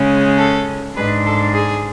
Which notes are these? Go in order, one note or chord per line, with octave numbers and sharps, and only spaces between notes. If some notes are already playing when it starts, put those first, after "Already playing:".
Already playing: C#3 G#3 C#4
A4
G#2 G#3 D4 G#4 B4
A4
G#4